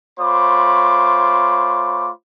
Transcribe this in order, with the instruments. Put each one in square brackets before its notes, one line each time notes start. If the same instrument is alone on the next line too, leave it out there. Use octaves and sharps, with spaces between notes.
[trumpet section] A3 F4 C5 C#5 B5 D6